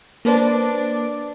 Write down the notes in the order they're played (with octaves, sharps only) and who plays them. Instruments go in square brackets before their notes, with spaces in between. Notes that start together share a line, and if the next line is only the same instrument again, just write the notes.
[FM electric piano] A#3 B4 C5 [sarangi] D4